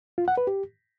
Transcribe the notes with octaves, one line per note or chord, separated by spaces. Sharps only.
F4
F#5
B4
G4